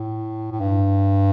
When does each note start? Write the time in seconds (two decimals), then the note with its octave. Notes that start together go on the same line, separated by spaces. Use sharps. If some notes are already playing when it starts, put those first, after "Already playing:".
Already playing: A2
0.52 A2
0.60 G2